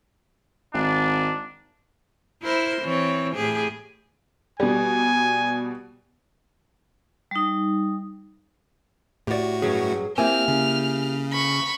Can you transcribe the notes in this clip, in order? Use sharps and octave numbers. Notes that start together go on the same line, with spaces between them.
G#1 D4
E4 A#4 C5
E3 C4 C#5
A2 G4 G#4
B2 G3 G#5
G3 D#4
A2 F#4 G4 D5
G2 F#3 C#4 G#4
A#3 C4 E4 G4 G#5 F6
C#3
B5 C#6